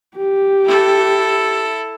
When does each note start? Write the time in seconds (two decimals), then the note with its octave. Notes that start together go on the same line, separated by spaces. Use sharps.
0.17 G4
0.65 E4 A4